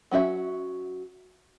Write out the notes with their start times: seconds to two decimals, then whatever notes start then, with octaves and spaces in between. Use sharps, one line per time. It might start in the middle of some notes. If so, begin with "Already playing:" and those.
0.11 F#3 C#4 F#4 E5